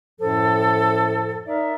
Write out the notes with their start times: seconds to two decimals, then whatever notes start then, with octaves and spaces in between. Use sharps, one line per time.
0.20 F#2 A2 F3 A4
1.47 D#4 A#4 D5 E5